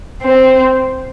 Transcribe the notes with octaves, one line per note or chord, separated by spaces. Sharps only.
C4